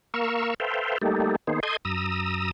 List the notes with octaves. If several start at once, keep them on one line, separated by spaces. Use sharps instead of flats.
A#3 A#4 F5 C#6 E6
A4 B4 C5 E5 F5 G5
G3 A3 A#3 D#4 G4 A4
D#3 A#3 B3 D#4 G#4 C5
A4 D#5 C6 D#6 G6 G#6
F#2 A#5 D#6 E6